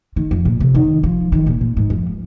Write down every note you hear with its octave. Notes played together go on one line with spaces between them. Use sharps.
D#3
F2
A#2
C3
D#3
F3
D#3
A#2
A#2
G#2
F2